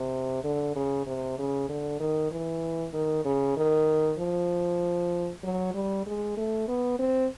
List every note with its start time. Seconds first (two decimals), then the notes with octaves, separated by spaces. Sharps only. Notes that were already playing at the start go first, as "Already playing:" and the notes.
Already playing: C3
0.44 D3
0.76 C#3
1.06 C3
1.38 C#3
1.69 D3
2.00 D#3
2.31 E3
2.93 D#3
3.25 C#3
3.57 D#3
4.19 F3
5.43 F#3
5.74 G3
6.06 G#3
6.37 A3
6.68 B3
6.99 C4